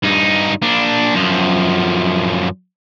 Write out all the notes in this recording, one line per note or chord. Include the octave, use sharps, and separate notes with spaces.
G2 D#4
A#2 D4
F#2 F3